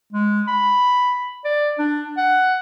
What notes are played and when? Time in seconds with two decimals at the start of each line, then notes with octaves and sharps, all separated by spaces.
0.13 G#3
0.48 B5
1.44 D5
1.79 D4
2.17 F#5